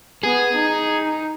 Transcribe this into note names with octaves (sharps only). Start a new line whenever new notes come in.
B3 G#4
D#4